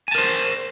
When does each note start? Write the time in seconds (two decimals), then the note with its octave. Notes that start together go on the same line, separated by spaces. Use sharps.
0.08 G#5
0.11 A5
0.15 A#4
0.18 C5